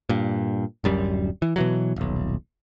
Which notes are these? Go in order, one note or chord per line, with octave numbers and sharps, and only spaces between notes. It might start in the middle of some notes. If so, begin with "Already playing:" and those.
G2 A#2
D1 F#2 G3
E3
B2 E3 F#3
D#1 B1